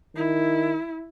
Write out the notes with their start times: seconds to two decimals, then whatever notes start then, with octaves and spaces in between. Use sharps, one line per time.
0.16 D#3 E4